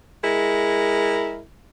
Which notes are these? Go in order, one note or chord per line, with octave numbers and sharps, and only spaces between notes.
G#3 E4 A#4